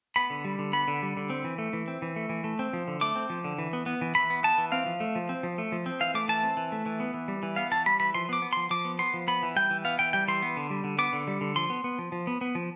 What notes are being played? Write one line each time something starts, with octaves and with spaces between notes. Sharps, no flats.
B3 B5
D3
G3
D3
B3 B5
D3
G3
D3
C4
E3
A3
E3
C4
E3
A3
E3
A3
C4
F3
D3
A3 D6
C4
F3
D3
E3
B3
B3
E3
E3 B5
B3
B3 A5
E3
C4 F5
F3
A3
F3
C4
F3
A3
F3
C4
E3 F5
A3 D6
E3 A5
C4
E3
A3
E3
B3
E3
G3
E3
B3 F5
E3 A5
G3 B5
E3 B5
F3 C6
B3 D6
B3
F3 C6
F3 D6
B3
B3 C6
F3
B3 B5
E3
G3 G5
E3
B3 F5
E3 G5
G3 G5
E3 C6
B3
D3
G3
D3
B3 D6
D3
G3
D3
F3 C6
B3
B3
F3
F3
B3
B3
F3